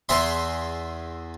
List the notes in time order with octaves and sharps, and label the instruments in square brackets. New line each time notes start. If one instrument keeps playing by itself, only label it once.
[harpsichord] E2 G#4 E5 C6